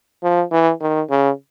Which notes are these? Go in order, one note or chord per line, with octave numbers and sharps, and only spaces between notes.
F3
E3
D#3
C#3